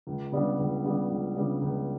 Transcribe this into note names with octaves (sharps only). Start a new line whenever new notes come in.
C#2
C#3 G3 B3 D4
C#2
C#3 G3 B3 D4
C#2
C#3 G3 B3 D4
C#2